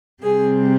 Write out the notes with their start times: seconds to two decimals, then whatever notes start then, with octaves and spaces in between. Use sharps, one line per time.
0.22 C3 G3 C4 G#4